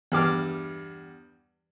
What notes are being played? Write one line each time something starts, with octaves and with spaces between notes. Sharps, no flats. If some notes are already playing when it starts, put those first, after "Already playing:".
E2 G2 D6 F6